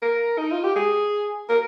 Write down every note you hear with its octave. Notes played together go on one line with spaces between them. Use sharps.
A#4
D#4
F4
G4
G#4
A#4